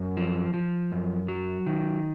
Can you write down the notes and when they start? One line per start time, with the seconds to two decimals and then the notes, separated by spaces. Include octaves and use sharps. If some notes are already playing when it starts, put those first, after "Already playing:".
Already playing: F#2
0.17 F3
0.54 F3
0.92 F#2
1.28 F#3
1.67 D#3